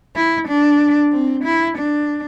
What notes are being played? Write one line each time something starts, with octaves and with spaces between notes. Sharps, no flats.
E4
D4
C4
E4
D4